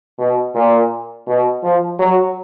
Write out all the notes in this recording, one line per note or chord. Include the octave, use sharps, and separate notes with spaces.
B2
A#2
B2
F3
F#3